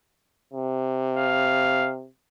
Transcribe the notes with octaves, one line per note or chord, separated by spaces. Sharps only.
C3
F5